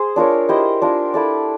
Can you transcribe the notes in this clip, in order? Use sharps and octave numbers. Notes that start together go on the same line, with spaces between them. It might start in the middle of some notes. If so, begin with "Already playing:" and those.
Already playing: G#4 C5
D4 F4 A#4 C#5
E4 G4 C5 D#5
D4 F4 A#4
E4 A4 D5